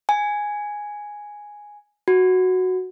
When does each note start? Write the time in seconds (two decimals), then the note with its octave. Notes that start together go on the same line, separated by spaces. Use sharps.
0.09 G#5
2.08 F#4